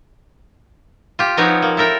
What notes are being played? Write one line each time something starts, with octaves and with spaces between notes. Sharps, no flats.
F4 G4
F3 B3 C4 D#4 G4 C#5
A#3
E4 A4 A#4 G5